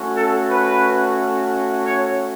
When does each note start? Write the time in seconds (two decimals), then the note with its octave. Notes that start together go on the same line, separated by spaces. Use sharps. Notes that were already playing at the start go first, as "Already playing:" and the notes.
Already playing: A3 C#4 F#4
0.15 A4
0.48 B4
1.83 C#5